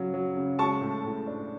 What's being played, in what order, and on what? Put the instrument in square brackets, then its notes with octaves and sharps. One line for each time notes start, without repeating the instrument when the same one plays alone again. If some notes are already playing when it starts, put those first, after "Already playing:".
Already playing: [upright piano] C#3 F#3
F#3
C#3
G#3 A5 C#6
A2
A2
D4